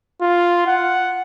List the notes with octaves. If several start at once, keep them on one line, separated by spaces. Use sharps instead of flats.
F4
F#5